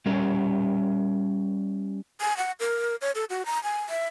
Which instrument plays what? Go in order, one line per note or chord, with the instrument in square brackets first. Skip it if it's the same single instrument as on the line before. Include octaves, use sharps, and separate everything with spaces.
[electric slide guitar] G3 C#4 G4 A#4
[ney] G#5
F#5
A#4
C#5
A4
F#4
A#5
G#5
E5